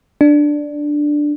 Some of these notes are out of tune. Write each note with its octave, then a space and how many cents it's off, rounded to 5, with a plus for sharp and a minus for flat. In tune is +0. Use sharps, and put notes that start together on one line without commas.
D4 +5